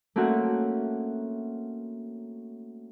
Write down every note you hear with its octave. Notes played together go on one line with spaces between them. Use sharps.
A3 A#3 C4 C#4 F#4 F#5